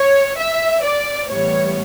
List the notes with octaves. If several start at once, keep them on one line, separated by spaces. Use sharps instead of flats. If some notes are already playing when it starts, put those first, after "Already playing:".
Already playing: C#5
E5
D5
A2 E3 G3 B3 C#5